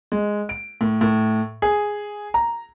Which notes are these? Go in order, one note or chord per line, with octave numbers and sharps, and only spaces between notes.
G#3
D7
A2
A2
G#4
A#5